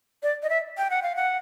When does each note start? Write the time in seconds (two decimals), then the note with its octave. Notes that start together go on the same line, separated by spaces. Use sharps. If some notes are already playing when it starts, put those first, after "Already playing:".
0.23 D5
0.43 D#5
0.49 E5
0.78 G5
0.90 F#5
1.03 F5
1.16 F#5